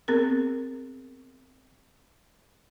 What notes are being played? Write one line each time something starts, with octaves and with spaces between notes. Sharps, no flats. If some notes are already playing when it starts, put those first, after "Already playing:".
B3 C4 G#4 A#4